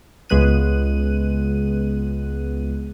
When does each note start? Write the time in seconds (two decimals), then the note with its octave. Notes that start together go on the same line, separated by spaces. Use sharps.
0.30 C#2 G#3 B3 F#6 D#7